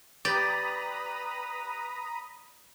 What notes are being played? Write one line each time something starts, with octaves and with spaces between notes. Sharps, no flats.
G4 B4 D5 A#5 B5 D#6